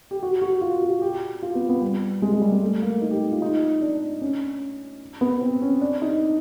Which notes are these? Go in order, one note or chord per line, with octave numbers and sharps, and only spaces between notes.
G4
F#4
F#4
F4
F#4
G4
F4
B3
B3
G3
G#3
G#3
G3
G#3
A3
A#3
D#4
G4
F4
D#4
D4
C#4
B3
C4
C#4
D4
D#4